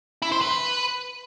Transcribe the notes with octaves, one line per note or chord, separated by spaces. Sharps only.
E4
C5
B4